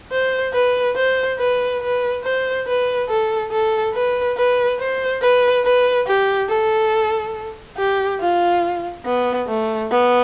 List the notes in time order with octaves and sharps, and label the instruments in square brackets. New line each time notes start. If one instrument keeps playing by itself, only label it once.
[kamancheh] C5
B4
C5
B4
B4
C5
B4
A4
A4
B4
B4
C5
B4
B4
G4
A4
G4
F4
B3
A3
B3